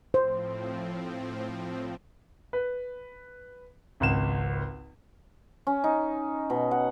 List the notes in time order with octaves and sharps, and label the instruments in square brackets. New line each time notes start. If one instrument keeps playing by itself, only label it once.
[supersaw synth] A2 F3 C4 [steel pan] C5
[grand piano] B4
G#1 C#2 E7
[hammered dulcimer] C#4
D#4
B2
F#5